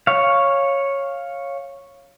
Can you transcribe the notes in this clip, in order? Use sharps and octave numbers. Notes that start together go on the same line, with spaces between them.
C#5 F5